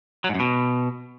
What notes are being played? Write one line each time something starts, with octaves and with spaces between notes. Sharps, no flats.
F#3
G#2
F#2
B2